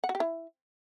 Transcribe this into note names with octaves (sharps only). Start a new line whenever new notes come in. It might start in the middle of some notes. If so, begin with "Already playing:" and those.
F#5
F#4
G4
E4